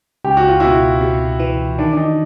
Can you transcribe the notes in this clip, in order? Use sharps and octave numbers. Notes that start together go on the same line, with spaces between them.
C#2 G4
F#4
F4
B2 E4 F#4
C3
E3
D#3 D4
D4
D#4